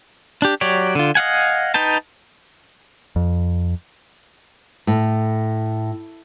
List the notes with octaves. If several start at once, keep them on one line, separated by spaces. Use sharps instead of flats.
D4 G4
F#3 G4 C#5 D5
D3 F4
D#5 F5 F#5 G#5
D#4 B4 G5 A5
F2
A2